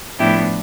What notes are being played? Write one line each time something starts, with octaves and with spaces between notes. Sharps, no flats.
A2 F3 B3 D4 E4 G4